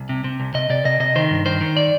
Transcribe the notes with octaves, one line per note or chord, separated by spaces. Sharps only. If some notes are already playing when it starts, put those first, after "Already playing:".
Already playing: C2
C3
C3
C2
C3 D#5
C3 D5
C3 D#5
C3 D#5
D#3 C5
G2
D#3 C5
D#3
D5